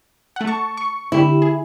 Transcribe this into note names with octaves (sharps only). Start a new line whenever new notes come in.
A3 F#5
A5 C#6
C#6
D3 E4 G4
G#4